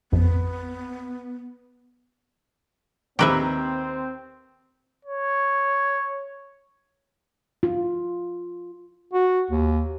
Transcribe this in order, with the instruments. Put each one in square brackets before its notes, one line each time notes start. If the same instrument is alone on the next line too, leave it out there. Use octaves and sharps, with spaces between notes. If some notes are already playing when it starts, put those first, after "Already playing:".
[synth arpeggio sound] A1 F2 [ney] B3
[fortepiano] D#2 A#5 [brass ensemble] C4 [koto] G4 B4 E5
[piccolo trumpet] C#5
[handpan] F4
[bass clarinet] F#4
D#2